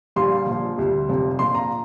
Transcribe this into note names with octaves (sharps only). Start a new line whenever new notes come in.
A#1 A#2 G3 C6
A#1 A#2 F3
D2 C3 G3
F1 F2 C3
A#1 A#2 F3 C6
A#5